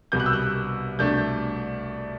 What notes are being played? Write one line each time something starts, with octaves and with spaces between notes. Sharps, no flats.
C2 B2 G3 B3 G6
F#6
E6
F#6
C2 B2 A3 D4 G6